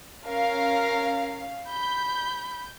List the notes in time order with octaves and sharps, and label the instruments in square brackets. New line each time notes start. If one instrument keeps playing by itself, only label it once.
[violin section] C#4 F5 [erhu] A#4
[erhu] B5 [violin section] G6